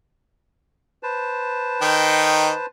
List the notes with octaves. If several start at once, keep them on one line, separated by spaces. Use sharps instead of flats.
B4 C5 A5
D#3 D#4 G5